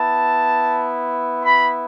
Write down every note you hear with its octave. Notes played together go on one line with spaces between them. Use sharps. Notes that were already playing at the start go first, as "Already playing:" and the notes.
Already playing: B3 E4 A5
B5